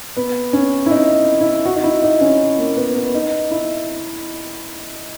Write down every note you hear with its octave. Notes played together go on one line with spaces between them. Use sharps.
B3
C#4
E4
D#4
E4
F#4
D#4
E4
D#4
C#4
A#3
B3
B3
D#4
E4